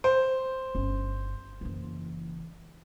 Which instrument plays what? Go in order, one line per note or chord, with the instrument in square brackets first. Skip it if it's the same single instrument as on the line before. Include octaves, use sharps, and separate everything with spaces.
[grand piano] C5
[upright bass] G1 C#4
F#1 E3